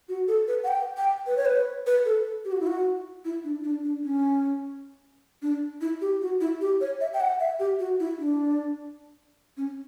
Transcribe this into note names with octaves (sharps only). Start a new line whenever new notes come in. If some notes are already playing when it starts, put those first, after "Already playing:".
F#4
A4
B4
F#5
G5
G5
B4
C#5
B4
B4
A4
G4
F#4
E4
F#4
E4
D4
D4
D4
C#4
D4
E4
G4
F#4
E4
G4
C#5
E5
G5
F#5
E5
G4
F#4
E4
D4
C#4